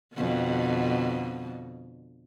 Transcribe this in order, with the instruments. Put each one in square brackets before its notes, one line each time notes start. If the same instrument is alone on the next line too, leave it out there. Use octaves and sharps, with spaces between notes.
[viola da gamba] F2 B2 D3